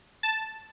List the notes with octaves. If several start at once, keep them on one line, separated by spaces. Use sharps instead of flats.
A5